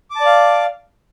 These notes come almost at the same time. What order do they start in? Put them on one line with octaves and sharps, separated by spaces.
D6 A5 D5 F5